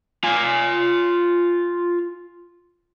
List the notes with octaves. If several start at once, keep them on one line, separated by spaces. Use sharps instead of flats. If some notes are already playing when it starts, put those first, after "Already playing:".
F4 G#5